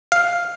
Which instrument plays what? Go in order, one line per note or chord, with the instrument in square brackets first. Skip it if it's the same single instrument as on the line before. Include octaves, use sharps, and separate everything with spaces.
[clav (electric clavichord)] F5